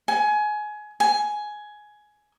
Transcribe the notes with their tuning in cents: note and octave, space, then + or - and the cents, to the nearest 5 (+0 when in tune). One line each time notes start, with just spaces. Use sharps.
G#5 +25
G#5 +10